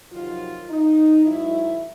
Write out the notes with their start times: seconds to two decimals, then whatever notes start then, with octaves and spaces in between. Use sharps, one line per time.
0.11 F2 C3 D#3 F#3 F4
0.69 D#4
1.25 G#2 D#3 F#3 E4